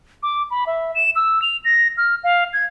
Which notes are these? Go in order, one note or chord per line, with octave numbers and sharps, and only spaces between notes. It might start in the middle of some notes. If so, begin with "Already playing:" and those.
D6
B5
E5
E7
E6
F7
A#6
F6
F5
G#6